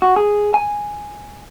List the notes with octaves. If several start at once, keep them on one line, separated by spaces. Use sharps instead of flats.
F#4
G#4
G#5